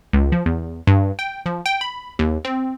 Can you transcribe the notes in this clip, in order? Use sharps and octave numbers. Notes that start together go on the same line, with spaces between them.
C#2
F3
E2
G2
G5
F3
G5
B5
D#2
C4